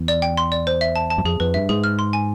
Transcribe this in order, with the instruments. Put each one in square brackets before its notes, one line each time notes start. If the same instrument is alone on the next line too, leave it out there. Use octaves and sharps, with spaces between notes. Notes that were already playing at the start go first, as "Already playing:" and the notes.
Already playing: [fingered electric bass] E2
[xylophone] D5
G5
C6
D5
C5
E5
A5
A5
[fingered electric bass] F#2
[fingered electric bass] F2 [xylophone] G#4
[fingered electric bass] F2 [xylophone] B4
[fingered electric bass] G2 [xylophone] E5
[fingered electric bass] G#2 [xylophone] G#4
[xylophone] F6
C6
G#5